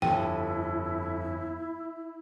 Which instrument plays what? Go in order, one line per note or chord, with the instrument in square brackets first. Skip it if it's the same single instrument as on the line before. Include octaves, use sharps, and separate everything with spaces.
[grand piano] G1 [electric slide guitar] F2 A4 [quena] E4 [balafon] G5